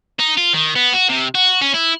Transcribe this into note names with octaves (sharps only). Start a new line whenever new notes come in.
D#4
F4
D#3
B3
F#4
C3
F#4
C#4
E4